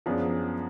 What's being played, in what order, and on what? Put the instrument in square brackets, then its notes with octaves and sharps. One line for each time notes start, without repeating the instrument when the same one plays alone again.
[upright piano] F#2 F3 B3 D4 G#4